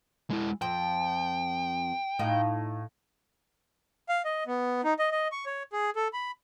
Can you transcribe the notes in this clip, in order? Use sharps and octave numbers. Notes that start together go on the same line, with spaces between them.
G#3 E4
F2 F3 G5
A2 D#4 F4
F5
D#5
B3
D#4
D#5
D#5
C#6
C#5
G#4
A4
B5